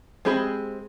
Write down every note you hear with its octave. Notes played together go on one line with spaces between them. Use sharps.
G#3 C4 G4 G#4 B5